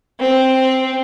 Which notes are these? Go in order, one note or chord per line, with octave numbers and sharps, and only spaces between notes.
C4